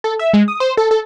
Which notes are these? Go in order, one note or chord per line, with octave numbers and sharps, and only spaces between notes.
A4
E5
G#3
D#6
C5
A4
A4